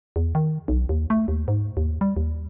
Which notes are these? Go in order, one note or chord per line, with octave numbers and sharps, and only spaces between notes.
E2
D#3
B1
D#2
A3
D#2
G#2
D#2
G3
D#2